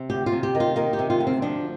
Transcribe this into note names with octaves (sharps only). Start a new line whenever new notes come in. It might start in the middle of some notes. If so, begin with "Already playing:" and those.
Already playing: C3
D2 G4
F4
C3
G4
D#3
F4
D#3 A#3
G4
C3
F4
D2
C4
F3 D4